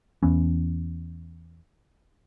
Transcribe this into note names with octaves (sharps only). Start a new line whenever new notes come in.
E2 E3 B3 C#4